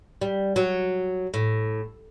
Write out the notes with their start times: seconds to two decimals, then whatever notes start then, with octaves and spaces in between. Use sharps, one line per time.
0.21 G3
0.56 F#3
1.34 A2